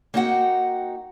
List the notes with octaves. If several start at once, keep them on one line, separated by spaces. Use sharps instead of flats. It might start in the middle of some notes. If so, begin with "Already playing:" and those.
A#3 C4 D#4 F#4 F#5 G5